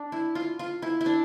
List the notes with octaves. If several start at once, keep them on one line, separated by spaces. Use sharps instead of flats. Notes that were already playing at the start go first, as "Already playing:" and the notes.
Already playing: D4
E4
F4
F4
E4
E4
D4